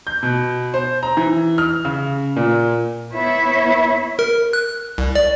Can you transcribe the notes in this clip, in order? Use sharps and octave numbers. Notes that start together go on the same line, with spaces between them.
G6
B2
C5
A#5
E3
F6
C#3
A#2
B3 E4 C#5 E5
A#4
F#6
C2
D5